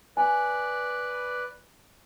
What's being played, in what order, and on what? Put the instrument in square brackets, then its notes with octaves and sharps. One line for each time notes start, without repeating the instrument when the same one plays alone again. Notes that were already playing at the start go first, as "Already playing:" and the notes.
[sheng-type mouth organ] B4 D5 [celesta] G#5